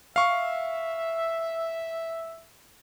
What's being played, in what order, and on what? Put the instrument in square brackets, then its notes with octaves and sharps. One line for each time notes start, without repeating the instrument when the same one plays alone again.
[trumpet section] E5 [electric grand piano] F5 C#6